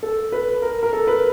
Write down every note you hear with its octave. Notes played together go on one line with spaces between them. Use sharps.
A4
B4
A#4
A#4
A4
B4